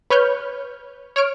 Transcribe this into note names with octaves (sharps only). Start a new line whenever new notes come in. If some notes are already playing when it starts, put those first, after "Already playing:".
B4 C#5 F6 G6
C#5 F6 D7